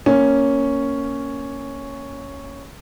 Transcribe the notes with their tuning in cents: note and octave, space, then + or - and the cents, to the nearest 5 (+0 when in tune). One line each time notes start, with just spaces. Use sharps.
A#3 +0 C#4 +0